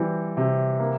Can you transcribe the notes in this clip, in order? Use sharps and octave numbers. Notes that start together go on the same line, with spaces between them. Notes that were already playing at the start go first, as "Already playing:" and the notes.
Already playing: E3 G3 C4
C3
A#3